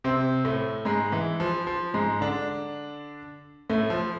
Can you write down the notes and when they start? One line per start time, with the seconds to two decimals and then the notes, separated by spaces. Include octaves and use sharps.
0.04 C3 C4
0.45 A2 A3
0.85 G#2 G#3
1.12 E3
1.40 F3
1.67 F3
1.94 G#2 G#3
2.21 D3 D4
3.70 A2 A3
3.90 F3